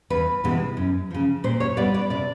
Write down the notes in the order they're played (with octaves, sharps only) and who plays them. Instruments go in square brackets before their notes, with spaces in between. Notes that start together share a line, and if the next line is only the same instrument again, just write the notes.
[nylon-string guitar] E2 B4
C3 E3 G#3 B3
F#2
C#3 F3
A#2 C5
C#5
G3 B3 D5
D5
C3 D5